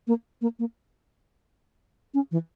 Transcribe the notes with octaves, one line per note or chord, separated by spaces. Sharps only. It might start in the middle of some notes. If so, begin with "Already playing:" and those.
A#3
A#3
A#3
C#4
E3